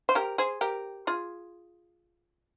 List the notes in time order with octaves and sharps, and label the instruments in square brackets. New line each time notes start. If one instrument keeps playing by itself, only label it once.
[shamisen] C5
G4 A#4
G#4 C5
G4 A#4
F4 G#4